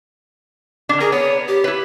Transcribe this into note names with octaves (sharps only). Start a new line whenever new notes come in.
D3 D4
G#4 A#4 G#5
B3 C#5
G4
E4 B4